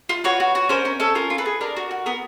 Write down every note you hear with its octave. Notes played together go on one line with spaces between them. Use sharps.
F4
F#4 B4 C#5
F#4
F#4
C#4 A#4 C5
C#4 A#4
C#4 A4
F4 A#4
F4
A4 B4
G#4
D4 A#4
F#4
F#4
B3 A#4